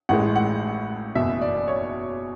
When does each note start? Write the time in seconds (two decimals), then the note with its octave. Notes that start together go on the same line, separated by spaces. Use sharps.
0.09 A1 A2 G#3 F#5
0.36 F#5
1.15 F#1 E2 B2 E5
1.41 D5
1.68 C#5